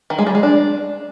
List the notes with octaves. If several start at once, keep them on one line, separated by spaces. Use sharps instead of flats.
D#3
G#3
G3
G#3
D4